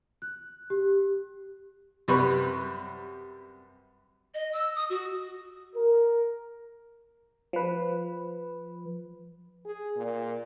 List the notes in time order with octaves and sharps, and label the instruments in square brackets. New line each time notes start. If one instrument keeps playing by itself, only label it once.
[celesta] F#6
G4
[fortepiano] F#2 C3 G3 B4 C#6
[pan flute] D#5
E6
D#6
F#4
[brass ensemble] A#4
[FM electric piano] F3 B4
[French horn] G#4
A#2